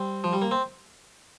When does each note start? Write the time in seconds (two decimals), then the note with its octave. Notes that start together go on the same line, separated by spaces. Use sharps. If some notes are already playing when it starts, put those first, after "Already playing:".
Already playing: G3 C4
0.24 F3
0.33 G3
0.42 A#3
0.51 C4